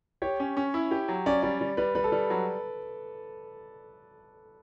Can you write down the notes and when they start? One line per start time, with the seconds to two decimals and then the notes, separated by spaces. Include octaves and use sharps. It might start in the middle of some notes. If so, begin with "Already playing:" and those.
0.22 G4 C#5
0.40 C#4
0.57 C#4
0.74 E4
0.91 G4
1.08 F#3
1.26 C#4 D5
1.42 G3 D5
1.61 G3
1.77 G3 B4
1.95 G3 B4
2.04 A4
2.12 G3
2.30 F#3